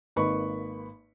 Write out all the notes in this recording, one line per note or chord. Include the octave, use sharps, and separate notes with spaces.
G#1 A#3 B4 D#5 B5 C#6